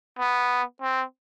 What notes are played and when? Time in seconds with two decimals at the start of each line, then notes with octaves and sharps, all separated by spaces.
0.19 B3
0.82 C4